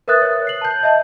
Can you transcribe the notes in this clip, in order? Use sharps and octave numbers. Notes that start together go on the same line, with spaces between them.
A#4 B4 E5 D#6 F#6 A6
C#5
C7 F#7
A5 G6
D#5 E5 A5